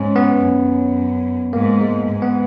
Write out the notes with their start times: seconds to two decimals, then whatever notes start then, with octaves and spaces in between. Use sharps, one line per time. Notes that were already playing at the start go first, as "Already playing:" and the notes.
Already playing: G#2 C#4
0.16 B3
0.44 F#2
1.53 G#2 A#3
1.81 G#3
2.09 G#2
2.22 B3